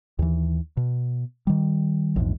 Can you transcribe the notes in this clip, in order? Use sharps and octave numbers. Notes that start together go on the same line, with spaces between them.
D#2 E3
B2
D#3 G3
A#1 E2 G#2